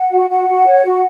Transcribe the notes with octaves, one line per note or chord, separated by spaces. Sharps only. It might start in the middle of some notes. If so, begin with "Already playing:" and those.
Already playing: F#5
F#4
F#4 F#5
F#4
C#5
F#4